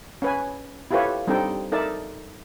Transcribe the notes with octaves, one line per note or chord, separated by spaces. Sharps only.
C#4 B4 G#5
E4 F4 G4 A4 B4 C#5
G3 C4 D4 D#4 A4 G5
D#4 A4 A#4 D5 E5 A5